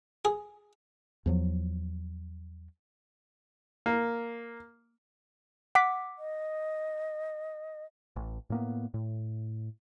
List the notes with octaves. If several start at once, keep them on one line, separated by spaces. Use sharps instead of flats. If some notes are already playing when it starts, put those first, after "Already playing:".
G#4
E2 F3 F#3
A#3
F#5 D6 B6
D#5
A1
A2 A#3 B3
A2